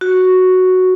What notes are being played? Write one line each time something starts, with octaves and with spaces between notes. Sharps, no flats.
F#4